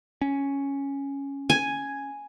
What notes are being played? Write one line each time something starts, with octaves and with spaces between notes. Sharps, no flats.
C#4
G#5